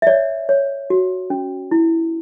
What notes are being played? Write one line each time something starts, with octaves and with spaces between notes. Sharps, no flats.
E5
C#5 D5
C#5
F#4
C#4
E4